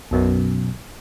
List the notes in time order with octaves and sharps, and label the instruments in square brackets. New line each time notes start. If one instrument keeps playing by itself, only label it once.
[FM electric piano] B1 F#2 B2